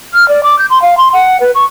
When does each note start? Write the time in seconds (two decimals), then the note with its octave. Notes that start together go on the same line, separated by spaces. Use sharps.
0.14 F6
0.29 D5
0.43 D6
0.59 G6
0.70 C6
0.82 F5
0.98 C6
1.13 F#5
1.41 B4
1.55 C#6